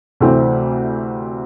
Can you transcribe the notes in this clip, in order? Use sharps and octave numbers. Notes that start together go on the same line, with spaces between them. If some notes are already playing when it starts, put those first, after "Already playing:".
D2 C3 E3 A3 C4